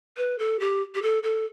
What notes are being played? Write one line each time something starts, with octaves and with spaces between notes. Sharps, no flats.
B4
A4
G4
G4
A4
A4